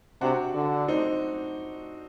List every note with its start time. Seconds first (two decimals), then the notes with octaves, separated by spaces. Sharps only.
0.21 C3 D4 F#4
0.55 D3
0.88 C4 D#4